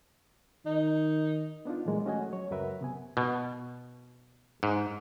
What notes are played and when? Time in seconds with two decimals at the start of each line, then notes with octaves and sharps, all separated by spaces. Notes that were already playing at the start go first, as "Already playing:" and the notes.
0.66 D#3 D#4
1.65 B3 D4 D#4 F4
1.86 A#2 E3 F#3 G#3 A#3
2.05 A3 C#4 F#4 D#5 G#5
2.33 F#3 C#5
2.51 C#2 F#2 F#4 A#4 B4 E5
2.81 C3 B3 G#5
3.17 B2
4.63 G#2